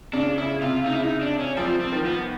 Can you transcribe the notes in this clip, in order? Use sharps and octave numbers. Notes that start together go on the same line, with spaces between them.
C#3 D4
C#3 E4
C3 F4
C#3 D#4
E4
D#4
D4
C#4
F3 G3 C4
C4
D#3 F3
B3